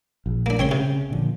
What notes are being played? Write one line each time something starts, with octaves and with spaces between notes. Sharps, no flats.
A#1
A#3 D4
C#3 C4 C#5 C6
C3
A#2 D3 F3